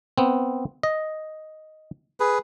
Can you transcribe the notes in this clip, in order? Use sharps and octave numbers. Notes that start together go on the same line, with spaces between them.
B3 C4
D#5
G#4 B4